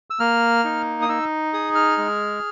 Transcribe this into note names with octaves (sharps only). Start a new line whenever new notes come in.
E6
A#3 F6
D#4
D#6
D#4 E6
G#4 D#6
F6
G#3